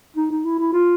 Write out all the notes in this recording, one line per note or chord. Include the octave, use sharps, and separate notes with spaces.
D#4
D#4
E4
E4
F4